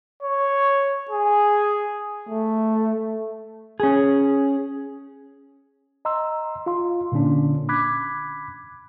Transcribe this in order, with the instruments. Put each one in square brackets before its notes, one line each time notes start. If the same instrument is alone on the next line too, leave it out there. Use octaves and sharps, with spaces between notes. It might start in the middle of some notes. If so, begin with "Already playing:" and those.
[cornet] C#5
G#4
[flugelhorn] A3
[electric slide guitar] C#4 G#4
[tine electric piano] D#5 A#5 C6 E6
F4 F5 C6
A#2 D3 A#3 C#4 D4
B5 D6 F#6 G#6 B6